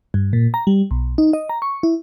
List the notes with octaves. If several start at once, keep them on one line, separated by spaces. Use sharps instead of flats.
G2
A#2
A#5
G3
B1
D#4
D#5
A#5
C#6
E4